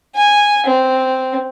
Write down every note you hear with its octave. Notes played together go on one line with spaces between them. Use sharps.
G#5
C4